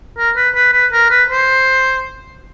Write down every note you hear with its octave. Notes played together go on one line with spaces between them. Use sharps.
A#4
B4
B4
B4
A#4
B4
C5